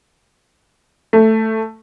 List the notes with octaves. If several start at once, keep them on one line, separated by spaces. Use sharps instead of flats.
A3